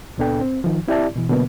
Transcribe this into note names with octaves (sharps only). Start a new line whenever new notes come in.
C#2 A#2 B3 D4 A4 G5
C4
D#3 F3
C4 E4 G4 D5 E5 A5
B2 E3
B2 D3 F#3 A#3 B3